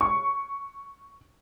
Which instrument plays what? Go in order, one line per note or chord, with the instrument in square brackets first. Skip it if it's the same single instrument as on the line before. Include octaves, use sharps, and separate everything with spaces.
[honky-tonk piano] C#6